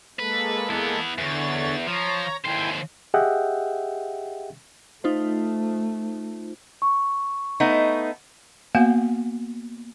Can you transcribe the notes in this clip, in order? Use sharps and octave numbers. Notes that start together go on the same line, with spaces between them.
G#3 A#3 A4 B4
B3 E4
E2 D3 C#5 A6
F3 C#5 A#5
D#2 E4 C5 G5 G#5
G4 G#4 D#5 E5 F#5 G5
A3 D#4 F4 C5
C#6
A3 B3 D#4
A#3 B3 F#4 F5 F#5 G#5